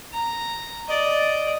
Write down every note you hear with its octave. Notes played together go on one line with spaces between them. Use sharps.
A#5
D5 D#5